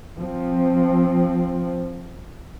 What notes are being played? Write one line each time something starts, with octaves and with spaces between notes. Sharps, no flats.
F3 C4